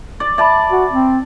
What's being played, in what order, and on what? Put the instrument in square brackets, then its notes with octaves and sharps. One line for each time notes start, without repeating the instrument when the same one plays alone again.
[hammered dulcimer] D5
[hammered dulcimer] D5 A5 [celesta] E5 B5
[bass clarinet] F#4
C4